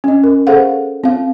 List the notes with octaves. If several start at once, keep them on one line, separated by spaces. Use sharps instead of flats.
C#4 D#5
A#4
G#4 A4 C5 F5 F#5
C4 F5